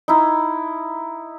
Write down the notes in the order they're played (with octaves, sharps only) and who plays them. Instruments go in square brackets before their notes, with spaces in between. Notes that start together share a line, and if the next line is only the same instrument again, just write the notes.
[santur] D#4 E4